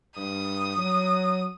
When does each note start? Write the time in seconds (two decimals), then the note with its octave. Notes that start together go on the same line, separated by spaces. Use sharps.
0.16 G2 D#6
0.77 F#3